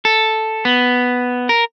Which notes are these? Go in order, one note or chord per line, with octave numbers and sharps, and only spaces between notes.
A4
B3
A#4